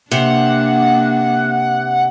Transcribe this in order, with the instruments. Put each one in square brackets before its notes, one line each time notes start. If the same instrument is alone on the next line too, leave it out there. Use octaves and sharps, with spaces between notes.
[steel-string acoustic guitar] C3 [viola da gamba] A#3 D4 [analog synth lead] F#5